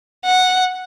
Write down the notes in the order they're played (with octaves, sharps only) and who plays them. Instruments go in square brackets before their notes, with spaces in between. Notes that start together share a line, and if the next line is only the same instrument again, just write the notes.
[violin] F#5